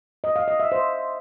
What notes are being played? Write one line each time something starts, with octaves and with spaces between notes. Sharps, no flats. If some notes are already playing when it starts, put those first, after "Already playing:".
D#5
F5
D#5
E5
C5